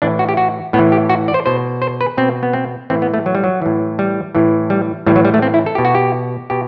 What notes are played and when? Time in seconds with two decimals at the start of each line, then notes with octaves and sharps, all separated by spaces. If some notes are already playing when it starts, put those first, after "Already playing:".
0.02 A2 E3 D4
0.19 F#4
0.29 G4
0.37 F#4
0.73 A2 B3
0.79 E3
0.92 G4
1.10 F#4
1.28 D5
1.34 C5
1.46 B2 C5
1.82 C5
2.01 B4
2.17 B2 C4
2.43 B3
2.53 C4
2.90 A2 E3 C4
3.02 B3
3.14 A3
3.26 F#3
3.35 G3
3.44 F#3
3.62 A2 E3
3.99 G3
4.35 A2 E3
4.70 G3
5.06 A2 E3 G3
5.16 F#3
5.25 G3
5.34 A3
5.42 C4
5.54 E4
5.66 A4
5.75 B2 G4
5.85 F#4
5.95 G4
6.50 B2 G4